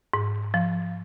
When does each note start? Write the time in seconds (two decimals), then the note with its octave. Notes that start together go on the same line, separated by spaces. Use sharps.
0.14 G#2
0.54 F3